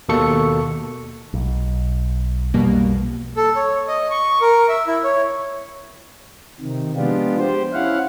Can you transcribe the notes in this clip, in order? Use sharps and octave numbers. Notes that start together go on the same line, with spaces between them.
D#2 B2 A#3 A4 C#6 C#7
B1
B1 F2 B2 G3 A#3
A4
C#5
D#5
C#6
A#4
E5
E4
C#5
C3 D#3
F3 G#3 B3 D4 F4 G4
G4 C5
C#4 E4 F5 F#5